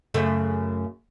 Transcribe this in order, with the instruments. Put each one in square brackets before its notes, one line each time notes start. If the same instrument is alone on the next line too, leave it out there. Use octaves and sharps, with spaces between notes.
[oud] F#2 C#3 A3